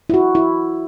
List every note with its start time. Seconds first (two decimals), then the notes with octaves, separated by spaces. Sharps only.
0.10 E4
0.14 F#4
0.35 E4